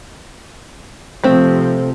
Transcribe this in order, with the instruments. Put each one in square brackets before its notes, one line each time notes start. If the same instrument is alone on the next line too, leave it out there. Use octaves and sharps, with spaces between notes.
[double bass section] C3 F3 [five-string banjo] A3 C4